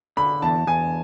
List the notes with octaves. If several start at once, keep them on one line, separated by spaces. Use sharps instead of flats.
D3 B5
E2 A5
E2 G#5